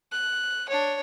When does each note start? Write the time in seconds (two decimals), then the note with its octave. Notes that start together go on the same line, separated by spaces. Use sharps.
0.11 F#6
0.69 D4 C#5